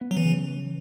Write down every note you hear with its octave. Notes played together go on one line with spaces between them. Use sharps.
B3
F#3
E3
C#3